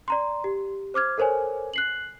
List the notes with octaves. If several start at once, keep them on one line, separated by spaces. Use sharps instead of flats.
D5 A#5 C6
G4
C5 D6 F6 G#6
A4 A#4 C5 C#5 G#5
F#6 C7 F#7